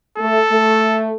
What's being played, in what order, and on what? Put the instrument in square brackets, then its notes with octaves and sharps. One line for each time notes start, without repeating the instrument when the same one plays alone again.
[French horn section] A3 [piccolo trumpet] A4
[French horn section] A3